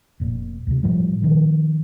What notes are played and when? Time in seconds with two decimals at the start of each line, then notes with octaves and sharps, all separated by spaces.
0.20 F1 A#2
0.67 D2 C3
0.83 A2 F3 G3
1.22 A#2 D#3 F3